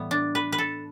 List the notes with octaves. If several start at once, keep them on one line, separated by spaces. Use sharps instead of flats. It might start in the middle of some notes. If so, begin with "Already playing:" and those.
Already playing: A2 E3 G3 B3
D4
B4
B4
A4